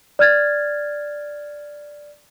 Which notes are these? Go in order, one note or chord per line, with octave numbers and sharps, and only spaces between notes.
D5 F6 G#6 A6